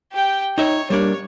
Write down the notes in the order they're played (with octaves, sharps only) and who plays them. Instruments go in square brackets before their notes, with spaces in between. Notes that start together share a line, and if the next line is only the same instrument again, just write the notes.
[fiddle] G4 G5
[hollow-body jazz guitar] D#4 E5 [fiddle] C#5
[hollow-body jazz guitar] G3 A#3 D4 [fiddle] C#5